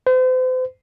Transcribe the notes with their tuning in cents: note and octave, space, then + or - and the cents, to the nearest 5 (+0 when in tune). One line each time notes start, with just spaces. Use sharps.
C5 -40